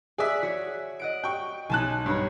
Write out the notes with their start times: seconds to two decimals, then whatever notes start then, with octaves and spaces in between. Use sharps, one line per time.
0.18 G#4 D5 E5 F#6 B6
0.43 F#4 C#5
0.99 D#5 F#5 D7
1.24 G5 C#6
1.70 B1 C#4 D#4 G#5 A5 F#6
2.06 G2 G4 C#5 A#5